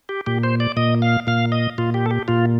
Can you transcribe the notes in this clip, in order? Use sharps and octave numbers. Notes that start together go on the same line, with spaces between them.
G4
A#2 G4
C5
D5
A#2 D#5
F5
A#2 F5
D#5
A#2 F4
G4
A4
G4
A#2 F4